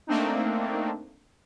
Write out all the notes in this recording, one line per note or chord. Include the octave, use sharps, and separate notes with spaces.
A3 A#3 C4 D4 D#4